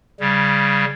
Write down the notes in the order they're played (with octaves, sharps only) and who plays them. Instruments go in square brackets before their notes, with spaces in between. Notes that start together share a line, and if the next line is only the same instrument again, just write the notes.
[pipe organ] C#3 G3